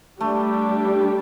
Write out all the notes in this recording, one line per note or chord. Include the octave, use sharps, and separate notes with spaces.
G3 A3 D4 G4